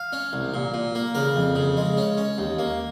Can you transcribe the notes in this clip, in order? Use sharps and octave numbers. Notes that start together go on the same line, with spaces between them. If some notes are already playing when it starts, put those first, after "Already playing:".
Already playing: F5
C#4
C2
A#2
A#2
A#3
C#3 A#4
F2
C#3
G#3
C#4
C#4
D#2
A#3